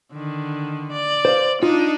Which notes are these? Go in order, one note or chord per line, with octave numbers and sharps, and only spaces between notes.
D3 D#3
D5
C5 F5
D4 D#4 F4